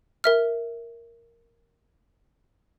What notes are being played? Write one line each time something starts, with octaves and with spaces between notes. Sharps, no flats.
A#4 E5 F6